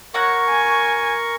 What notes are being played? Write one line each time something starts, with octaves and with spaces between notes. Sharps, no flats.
F#4 A#4 C#5 F#5 C#6
G#5